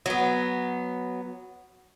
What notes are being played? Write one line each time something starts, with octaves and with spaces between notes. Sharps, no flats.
F#3 B3